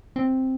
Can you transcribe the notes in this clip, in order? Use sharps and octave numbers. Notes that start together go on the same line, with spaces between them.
C4